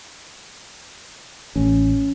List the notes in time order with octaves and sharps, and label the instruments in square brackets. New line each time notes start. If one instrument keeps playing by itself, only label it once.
[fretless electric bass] A1 [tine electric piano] C#4